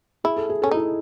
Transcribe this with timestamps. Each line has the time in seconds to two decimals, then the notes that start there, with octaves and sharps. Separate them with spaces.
0.24 E4 G#4
0.37 A4
0.49 G#4
0.62 C#4 A4
0.71 D#4 E4 G#4